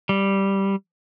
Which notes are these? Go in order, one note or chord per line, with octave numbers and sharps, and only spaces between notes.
G3